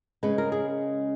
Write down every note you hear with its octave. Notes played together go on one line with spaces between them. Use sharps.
C#3 G#3 C#4 B4
A#4
G#4